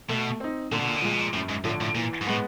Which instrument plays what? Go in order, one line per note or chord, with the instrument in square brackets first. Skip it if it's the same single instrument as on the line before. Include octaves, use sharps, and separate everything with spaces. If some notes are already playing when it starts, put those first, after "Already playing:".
[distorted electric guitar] B2 [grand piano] A3
[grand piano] C4 D#4
[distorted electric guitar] A#2 [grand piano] D3
[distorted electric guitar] B2
A#2
B2
[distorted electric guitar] A#2 [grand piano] F3 G#3
[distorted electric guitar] B2
A#2
[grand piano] F#2 [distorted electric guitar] A2
[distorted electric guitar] G#2
[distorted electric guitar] A2 [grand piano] D3 F3
[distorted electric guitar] A2
[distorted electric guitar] A#2 [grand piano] E3
[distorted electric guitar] G#2
[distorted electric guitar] A2 [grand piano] G#3 B3